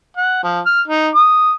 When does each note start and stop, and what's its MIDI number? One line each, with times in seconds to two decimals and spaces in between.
0.17 0.40 78
0.43 0.60 53
0.66 0.81 89
0.88 1.09 63
1.15 1.53 87